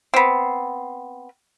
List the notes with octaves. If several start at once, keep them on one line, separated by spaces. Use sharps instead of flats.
B3 C4